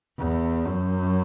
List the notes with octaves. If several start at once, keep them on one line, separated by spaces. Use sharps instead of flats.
E2
F#2